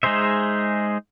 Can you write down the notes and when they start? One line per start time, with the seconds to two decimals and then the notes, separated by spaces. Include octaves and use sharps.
0.03 G#3 D#4 G#4 C5 E5